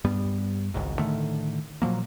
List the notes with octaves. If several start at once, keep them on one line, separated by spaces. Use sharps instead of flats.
G2 G3 B3
G#1 C#2 G#2
A2 D3 D#3 A3
A#2 F3 F#3 A#3